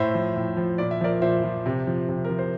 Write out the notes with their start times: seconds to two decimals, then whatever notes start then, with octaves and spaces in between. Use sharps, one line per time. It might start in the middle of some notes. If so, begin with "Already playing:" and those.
Already playing: A2 C5 E5
0.14 F3
0.36 A2
0.57 F3
0.78 A#2 D5
0.91 E5
1.01 F3 A#4 D5
1.22 A#2 C5 E5
1.44 F3
1.66 C3
1.87 F3
2.09 C3
2.25 F3 A#4
2.39 C5